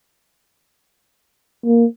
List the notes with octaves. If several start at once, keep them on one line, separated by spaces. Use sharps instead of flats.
A#3